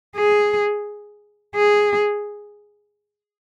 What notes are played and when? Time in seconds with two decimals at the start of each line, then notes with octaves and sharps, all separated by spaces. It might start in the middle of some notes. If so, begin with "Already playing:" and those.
0.16 G#4
1.55 G#4